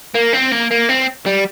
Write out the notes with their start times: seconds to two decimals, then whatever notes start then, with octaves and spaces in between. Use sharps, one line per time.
0.15 A#3
0.33 C4
0.52 A#3
0.71 A#3
0.89 C4
1.27 G3